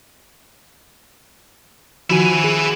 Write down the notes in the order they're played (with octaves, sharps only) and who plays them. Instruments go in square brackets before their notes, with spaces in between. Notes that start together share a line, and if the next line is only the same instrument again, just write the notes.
[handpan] D#3 F3 F#4 [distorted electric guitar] E4 G#5
[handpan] G#4